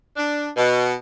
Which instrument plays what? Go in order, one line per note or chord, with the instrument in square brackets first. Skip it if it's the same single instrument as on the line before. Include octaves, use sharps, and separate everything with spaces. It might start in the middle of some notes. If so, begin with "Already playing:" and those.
[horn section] D4
B2